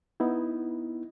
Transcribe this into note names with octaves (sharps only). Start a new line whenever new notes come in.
B3 D#4 E4